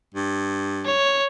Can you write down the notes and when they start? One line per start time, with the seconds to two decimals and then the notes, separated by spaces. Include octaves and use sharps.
0.14 G2
0.86 C#5